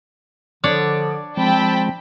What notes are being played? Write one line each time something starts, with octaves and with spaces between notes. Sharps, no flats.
D3 F3 D4 C#5 D5
F3 G#3 C4 G5 A5 B5